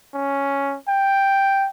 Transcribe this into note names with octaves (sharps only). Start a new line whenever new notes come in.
C#4
G5